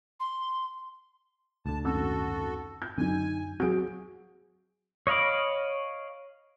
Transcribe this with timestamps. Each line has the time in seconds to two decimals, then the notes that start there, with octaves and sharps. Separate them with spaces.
0.20 C6
1.66 D2 D3 A5
1.84 G#1 F#2 F#4 A4 E6
2.82 G6
2.98 F#2 D3 F#3 D#4 G#5
3.60 D#2 F#3 C4 F#4 G#4 G6 D7
5.07 C#5 D#5 F5 B5 D6